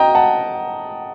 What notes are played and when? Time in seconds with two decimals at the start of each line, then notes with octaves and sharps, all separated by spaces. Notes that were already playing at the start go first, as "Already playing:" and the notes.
Already playing: C4 D#5 G5 A#5
0.15 F#5 A5